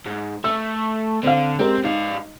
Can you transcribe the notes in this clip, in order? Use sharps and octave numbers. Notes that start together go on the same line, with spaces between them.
G#2
A3 E6
D3 C4 F5
G#3 C4 G4 A#4
G#2 D#4 F5